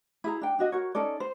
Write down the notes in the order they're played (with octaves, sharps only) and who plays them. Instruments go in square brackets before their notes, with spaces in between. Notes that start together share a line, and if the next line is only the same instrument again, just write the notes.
[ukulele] E4 G#4 A#5
D4 G5
D4 F#4 D#5
F#4 A#4 C#5
C#4 D#4 A4 D5
C5